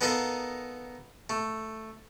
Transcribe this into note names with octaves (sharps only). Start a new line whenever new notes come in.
B3 D#4 A4 A#4 D#5 F5
A3